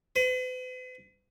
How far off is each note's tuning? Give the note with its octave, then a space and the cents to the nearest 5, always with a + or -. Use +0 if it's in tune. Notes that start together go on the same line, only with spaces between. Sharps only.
B4 +45